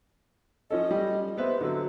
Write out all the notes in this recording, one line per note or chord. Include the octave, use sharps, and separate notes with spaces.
F3 C#4 A4 D#5
G3
B3 B4 C5 E5
D3 F#3 A4